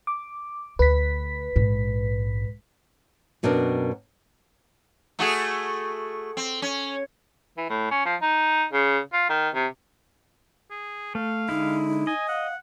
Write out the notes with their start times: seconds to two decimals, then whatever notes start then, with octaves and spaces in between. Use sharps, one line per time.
0.07 D6
0.79 D2 B4 B6
1.56 A#1 G#2
3.43 F#2 B2 C4 D4 A#4
5.19 A3 F#4 G#4
6.37 C4
6.62 C#4
7.57 E3
7.69 A2
7.91 C#4
8.05 F3
8.22 D#4
8.73 C#3
9.13 F4
9.29 D#3
9.55 C3
10.70 G#4
11.15 A3 F5
11.49 D3 G#3 D#4 E4
12.07 D#5 G#5
12.29 F5 F#5